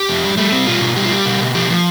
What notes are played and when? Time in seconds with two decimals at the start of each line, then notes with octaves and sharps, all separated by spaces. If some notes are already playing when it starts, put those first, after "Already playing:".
Already playing: G4
0.09 F2
0.24 G3
0.37 G3 A3
0.52 G3 C4
0.67 B2 F4
0.81 B2
0.96 G3 G4
1.04 F4
1.10 G3 G4
1.26 B2
1.40 B2
1.55 F3 G4
1.70 F3